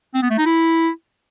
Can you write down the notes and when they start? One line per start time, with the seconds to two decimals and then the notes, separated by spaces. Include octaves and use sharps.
0.15 C4
0.23 B3
0.30 A3
0.38 D#4
0.46 E4